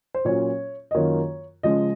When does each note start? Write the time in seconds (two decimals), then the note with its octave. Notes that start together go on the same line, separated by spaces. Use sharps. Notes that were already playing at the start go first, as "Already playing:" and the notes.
0.15 C5
0.25 A#2 F#3 C#4 F4 C#5
0.91 D#5
0.95 F#2 D#3 A#3 F4 C#5
1.63 C#3 F3 G#3 D#5